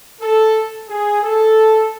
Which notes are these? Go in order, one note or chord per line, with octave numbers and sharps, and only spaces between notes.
A4
G#4
A4